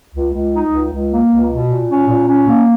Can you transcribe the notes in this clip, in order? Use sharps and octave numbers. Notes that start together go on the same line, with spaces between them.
C#2
C#2
D#4
C#2
C#2
A#3
C#2
B2
A#2
C#4
A#2
C#4
A#3